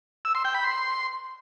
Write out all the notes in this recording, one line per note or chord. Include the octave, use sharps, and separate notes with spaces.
E6
C6
G5
B5
C6